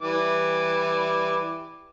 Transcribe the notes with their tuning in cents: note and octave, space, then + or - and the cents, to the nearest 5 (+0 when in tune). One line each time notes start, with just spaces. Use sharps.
E3 +0 G3 +0 D6 +0